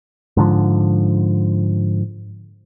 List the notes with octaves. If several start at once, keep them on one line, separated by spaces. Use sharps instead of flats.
G#2 D3 F3